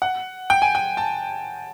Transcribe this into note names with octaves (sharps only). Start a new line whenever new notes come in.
F#5
G5
G#5
G5
A5